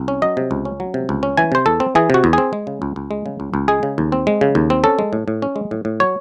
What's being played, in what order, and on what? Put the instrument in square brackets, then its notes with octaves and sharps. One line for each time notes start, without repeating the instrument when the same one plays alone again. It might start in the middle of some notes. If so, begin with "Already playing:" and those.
Already playing: [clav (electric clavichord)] C2
C#4
F#3 D#5
C3
C#2
C#4
F#3
C3
C#2
C#4
E3 G#5
C3 C5
E2 A4
C4
E3 G#4
C3 F#4
E2
C4 G#4
G#3
C#3
C#2
C#2
G#3
C#3
C#2
C#2
G#3 G#4
C#3
D#2
C4
G#3
C#3
D#2
C4
C#4 A4
G#3
A2
A2
C#4
G#3
A2
A2
F#3 C#5